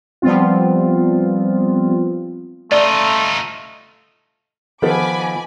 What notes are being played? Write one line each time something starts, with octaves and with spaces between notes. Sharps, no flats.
F3 G3 B3 C4 F4
A3 D#4 F4 D5
D#3 F3 B3 D#4 A4 G#5 B5 D6